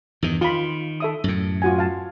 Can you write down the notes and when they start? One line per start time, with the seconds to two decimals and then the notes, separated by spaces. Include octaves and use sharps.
0.22 E2 G2 D#3
0.41 D#3 F4 B5
1.00 A4 E5 D#6
1.24 F#2 A2
1.62 F4 F#4 G#5
1.79 F5 A5